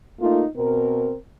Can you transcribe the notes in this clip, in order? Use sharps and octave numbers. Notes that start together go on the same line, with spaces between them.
A3 A#3 D#4 F4
B2 C4 A#4